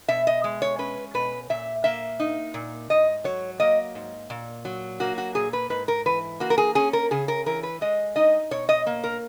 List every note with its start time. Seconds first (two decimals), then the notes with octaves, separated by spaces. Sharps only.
0.08 B2 E5
0.27 D#5
0.44 G#3
0.62 C#5
0.79 C#4 B4
1.14 B2 B4
1.50 A#2 E5
1.84 A#3 E5
2.20 D#4
2.54 A#2
2.90 G#2 D#5
3.24 F#3 C#5
3.60 A#3 D#5
3.95 G#2
4.30 A#2
4.65 F#3
5.00 A#3 F#4
5.18 F#4
5.35 A#2 G#4
5.53 B4
5.70 G#2 B4
5.88 A#4
6.06 E3 B4
6.40 A#3 F#4
6.50 A#4
6.58 G#4
6.75 C#4 G#4
6.93 A#4
7.11 C#3 G#4
7.28 A#4
7.46 E3 A#4
7.63 B4
7.81 G#3 D#5
8.16 D#4 D#5
8.51 B2 C#5
8.69 D#5
8.86 A#3
9.04 A#4